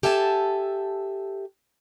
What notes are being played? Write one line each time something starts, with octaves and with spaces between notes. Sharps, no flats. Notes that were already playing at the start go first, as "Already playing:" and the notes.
G4 A4 E5 G#5 A5